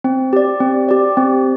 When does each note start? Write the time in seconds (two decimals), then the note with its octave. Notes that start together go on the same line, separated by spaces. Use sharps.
0.04 C4
0.33 G4 D5
0.60 C4
0.89 G4 D5
1.17 C4